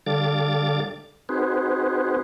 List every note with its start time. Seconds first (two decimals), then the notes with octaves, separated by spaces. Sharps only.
0.06 D3 G3 A4 F5 D6 A6
1.29 C4 D#4 F#4 G#4 B4 C5